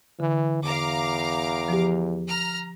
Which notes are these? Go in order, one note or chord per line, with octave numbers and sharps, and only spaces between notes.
D3 E3
E2 F5 A#5 D6
F3 G4
A#5 F6